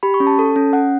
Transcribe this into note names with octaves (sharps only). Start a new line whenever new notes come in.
G4 B5
C#6
C#4
A5
A4
C#4
C#4 F#5